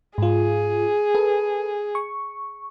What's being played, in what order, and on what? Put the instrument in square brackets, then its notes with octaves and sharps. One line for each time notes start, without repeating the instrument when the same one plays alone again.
[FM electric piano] G#2 F4 [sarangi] G#4
[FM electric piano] A4 B4
C#6